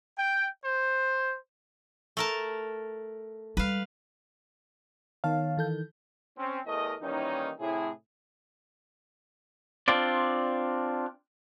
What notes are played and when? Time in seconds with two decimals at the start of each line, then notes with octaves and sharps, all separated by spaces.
0.18 G5
0.65 C5
2.17 A3 A#4 A5
3.57 G3 G#3 B4 F5
5.24 D#3 B3 C#5 F5 A5
5.57 E3 A4 G6
6.37 C4 C#4
6.66 E2 E3 A3 A#4 D#5
7.01 D#3 E3 G3 A#3 C#4 D#4
7.59 A2 C3 E4 G#4
9.88 C4 D4 F4 D5